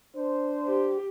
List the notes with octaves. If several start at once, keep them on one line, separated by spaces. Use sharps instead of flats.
D4 C5
G4